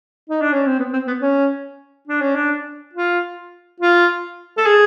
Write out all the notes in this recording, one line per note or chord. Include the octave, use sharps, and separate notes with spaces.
D#4
D4
C#4
C4
B3
C4
B3
C#4
D4
C#4
D4
F4
F4
A4
G#4